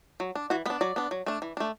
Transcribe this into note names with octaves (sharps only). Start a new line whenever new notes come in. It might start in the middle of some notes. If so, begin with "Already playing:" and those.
F#3
D4
E3 F#4
B3 D4 B4
F#3 D5
B3 D4
F#3
A3 D4
E3
A3 D4